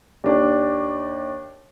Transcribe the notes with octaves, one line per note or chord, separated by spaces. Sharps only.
D#2 D4